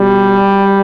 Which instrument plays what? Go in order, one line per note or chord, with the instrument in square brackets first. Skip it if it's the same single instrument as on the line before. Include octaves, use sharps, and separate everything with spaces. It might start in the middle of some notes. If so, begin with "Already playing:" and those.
Already playing: [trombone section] B2 G3